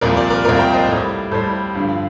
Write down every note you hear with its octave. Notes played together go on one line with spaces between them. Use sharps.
C2 A#2 F3 A#4 D5
A#4 D5
A#4 D5
C2 A#2 F3 A#4 D5
G5 A#5
C5 D#5
A2 G3
A2 G3 A4 C5
G2 D3 F3